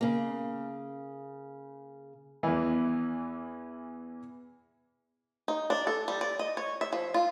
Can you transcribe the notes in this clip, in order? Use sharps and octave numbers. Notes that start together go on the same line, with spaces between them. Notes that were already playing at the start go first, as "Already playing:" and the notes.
C#3 A#3
E2 E3
D#4
D4
A4
G3
D5
D#5
C#5
E5
F3
F4